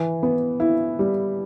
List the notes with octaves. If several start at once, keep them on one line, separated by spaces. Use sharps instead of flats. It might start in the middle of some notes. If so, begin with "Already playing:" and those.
Already playing: E3
B3
E4
G3